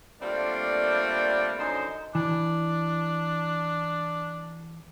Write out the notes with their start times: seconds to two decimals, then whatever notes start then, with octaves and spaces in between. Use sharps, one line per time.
0.21 G3 A3 A#3 C4 D4 F4
1.58 F#2 D3 D#4 C5
2.15 E3 D4